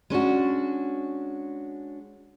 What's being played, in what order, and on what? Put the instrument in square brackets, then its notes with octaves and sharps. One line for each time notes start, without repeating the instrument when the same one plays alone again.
[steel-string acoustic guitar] G#3 C#4 D4 F#4